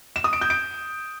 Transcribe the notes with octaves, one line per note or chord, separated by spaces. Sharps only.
E7
D#6
D7
G6
D7